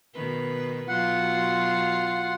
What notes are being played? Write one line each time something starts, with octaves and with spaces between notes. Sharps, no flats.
B2 D#3 B4
B2 F#3 F4 F#5 C6